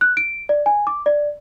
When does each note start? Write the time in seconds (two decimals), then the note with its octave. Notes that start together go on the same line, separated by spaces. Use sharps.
0.01 F#6
0.17 D7
0.49 D5
0.66 G#5
0.87 D6
1.06 D5